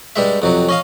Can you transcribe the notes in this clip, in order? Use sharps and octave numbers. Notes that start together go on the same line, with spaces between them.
G2 G3 G#3 E5
F2 C3 F#3
C#4 D#5 F5